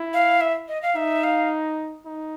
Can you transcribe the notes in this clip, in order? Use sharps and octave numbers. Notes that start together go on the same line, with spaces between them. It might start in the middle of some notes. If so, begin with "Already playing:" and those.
Already playing: E4
F5
E5
D#5
F5
D#4 E5
F5
D#4